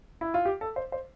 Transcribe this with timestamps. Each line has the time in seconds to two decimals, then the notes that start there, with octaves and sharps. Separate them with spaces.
0.21 E4
0.34 F4
0.45 G4
0.61 A4
0.76 C5
0.92 C5